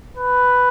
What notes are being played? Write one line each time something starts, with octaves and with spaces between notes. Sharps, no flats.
B4